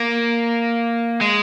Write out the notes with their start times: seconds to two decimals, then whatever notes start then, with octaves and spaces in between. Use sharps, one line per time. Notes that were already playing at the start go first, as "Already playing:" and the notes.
Already playing: A#3
1.21 G#3